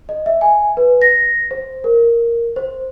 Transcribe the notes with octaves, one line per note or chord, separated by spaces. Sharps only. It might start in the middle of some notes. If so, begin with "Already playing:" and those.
D#5
E5
G#5
B4
A#6
C5
A#4
C5